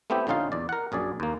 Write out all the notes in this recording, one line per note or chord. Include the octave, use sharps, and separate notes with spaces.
A3 B3 C4 E4 G4
A#1 D3 C#4 D#4 F4 F5
E2 D5
A#4 F#5
A#1 F#2 G#4 D5
D#2 A#3